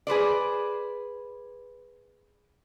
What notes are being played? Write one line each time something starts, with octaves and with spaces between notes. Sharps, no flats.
G#4 B4 C5 D5